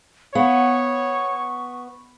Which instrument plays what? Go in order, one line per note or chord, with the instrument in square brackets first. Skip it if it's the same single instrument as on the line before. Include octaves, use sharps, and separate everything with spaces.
[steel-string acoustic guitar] B3 [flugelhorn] C#5 [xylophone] F5 F#5 [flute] C#6